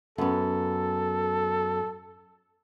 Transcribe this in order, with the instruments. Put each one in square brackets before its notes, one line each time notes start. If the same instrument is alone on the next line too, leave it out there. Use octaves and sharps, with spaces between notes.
[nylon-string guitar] F#2 B3 [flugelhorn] A4